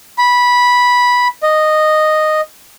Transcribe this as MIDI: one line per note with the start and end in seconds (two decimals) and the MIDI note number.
0.18 1.28 83
1.43 2.41 75